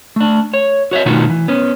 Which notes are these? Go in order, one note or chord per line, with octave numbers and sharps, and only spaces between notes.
A3 D4
C#5
F#4 C#5 D#5 E5
B2 D#3 A3 D#4 F4 F#4
E3
B3 C#4